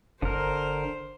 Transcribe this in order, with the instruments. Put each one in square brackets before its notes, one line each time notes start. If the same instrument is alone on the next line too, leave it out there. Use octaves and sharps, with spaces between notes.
[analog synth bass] G1 [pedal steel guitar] D3 A#4 [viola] C5